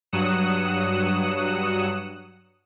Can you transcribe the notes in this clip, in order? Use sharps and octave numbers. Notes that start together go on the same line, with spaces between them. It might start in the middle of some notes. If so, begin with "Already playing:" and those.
G2 F#3 D#6 F#6 C#7 E7